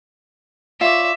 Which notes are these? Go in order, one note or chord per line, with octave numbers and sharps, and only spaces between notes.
F4 C#5 D5 E5